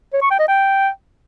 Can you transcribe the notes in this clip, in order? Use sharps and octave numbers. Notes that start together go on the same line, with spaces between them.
C#5
C#6
G5
D#5
G5